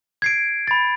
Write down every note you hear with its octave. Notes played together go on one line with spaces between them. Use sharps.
G#6 C7 D7
B5 A6